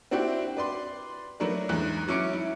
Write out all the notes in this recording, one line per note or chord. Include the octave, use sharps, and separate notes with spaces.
C4 D4 E4 F#4 G4
B4 D5 C6
F#3 A3 D4 F#4 A#4 B4
E2 G#2 F#6
F#3 C#4 E4 D6 C#7 D7
E4